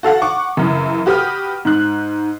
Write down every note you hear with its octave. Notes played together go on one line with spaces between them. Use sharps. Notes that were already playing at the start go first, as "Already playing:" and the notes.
F#4 A4 F5 F#5
F#5 C#6 D6
F#2 C#3 E3
F#4 G4 B4 D#6 F6
G#2 F#6